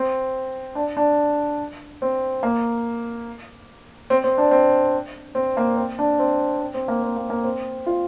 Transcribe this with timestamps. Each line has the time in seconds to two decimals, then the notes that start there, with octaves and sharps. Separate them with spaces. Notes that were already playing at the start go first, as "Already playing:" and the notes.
Already playing: C4
0.75 D4
0.97 D4
2.02 C4
2.43 A#3
4.10 C4
4.24 C4
4.38 D4
4.51 C4
5.35 C4
5.57 A#3
5.77 C4
5.99 D4
6.19 C4
6.61 C4
6.74 C4
6.88 A#3
7.03 C4
7.17 A#3
7.30 A#3
7.44 C4
7.86 F4